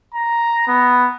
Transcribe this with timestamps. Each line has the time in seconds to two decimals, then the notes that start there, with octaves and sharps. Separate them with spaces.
0.14 A#5
0.67 B3